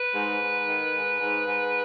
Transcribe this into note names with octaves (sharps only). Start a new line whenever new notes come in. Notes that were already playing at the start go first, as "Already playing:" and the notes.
Already playing: B4
G#2
G#2
D#3
G#2
G#2
G#2